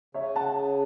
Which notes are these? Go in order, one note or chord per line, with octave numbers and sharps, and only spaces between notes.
C#3 C#5 E5
F#5 A5
C#3